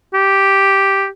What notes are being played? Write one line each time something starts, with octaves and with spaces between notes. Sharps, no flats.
G4